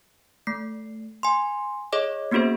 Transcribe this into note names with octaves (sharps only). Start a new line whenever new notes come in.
A3 C7
G#5 C6
G#4 C#5 D#5 D6
A#3 B3 C#4 F#4 G#4 C5